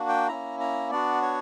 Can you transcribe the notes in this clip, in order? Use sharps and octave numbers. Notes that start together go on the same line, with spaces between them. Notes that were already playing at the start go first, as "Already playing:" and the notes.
Already playing: A#3 D4 F#4
G5
A#3 C#4 E4 A#5
A#5
B3 D4 F#4 D5
C#5